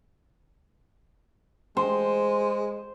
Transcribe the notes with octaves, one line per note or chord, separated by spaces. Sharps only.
G#3 C5